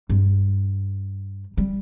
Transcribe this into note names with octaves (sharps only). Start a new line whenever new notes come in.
G2
G3